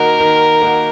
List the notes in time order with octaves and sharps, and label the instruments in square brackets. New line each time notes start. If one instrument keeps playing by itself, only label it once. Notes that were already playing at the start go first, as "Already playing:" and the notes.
Already playing: [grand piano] D#3 A#3 D#4 F#4 [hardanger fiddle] A#4
[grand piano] D#3
A#3 D#4 F#4